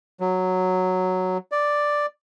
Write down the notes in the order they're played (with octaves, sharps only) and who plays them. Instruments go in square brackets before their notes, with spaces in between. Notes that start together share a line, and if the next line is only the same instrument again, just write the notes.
[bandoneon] F#3
D5